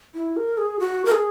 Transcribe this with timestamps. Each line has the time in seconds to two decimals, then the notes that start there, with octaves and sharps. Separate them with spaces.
0.15 E4
0.37 A#4
0.58 G#4
0.80 F#4
1.05 A#4
1.12 G#4